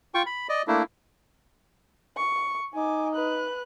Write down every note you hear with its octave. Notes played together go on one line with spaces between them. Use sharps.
F4 G5 C#6
B5
D5 D#5
A3 A#3 D4 E4
C#6
D#4 G#5 D6
B4 F#6